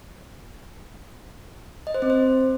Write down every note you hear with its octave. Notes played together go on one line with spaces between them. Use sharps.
D#5
C5
C4
C5